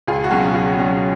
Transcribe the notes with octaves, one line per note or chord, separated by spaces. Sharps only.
C#2 F4 G#4
F#4
B2 F#3 C#4 F4 G#4
C#2 F4 G#4
B2 F#3 C#4